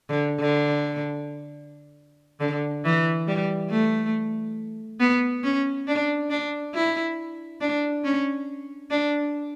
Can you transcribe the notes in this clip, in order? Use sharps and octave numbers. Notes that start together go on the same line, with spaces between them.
D3
D3
D3
E3
G3
A3
B3
C#4
D4
D4
E4
D4
C#4
D4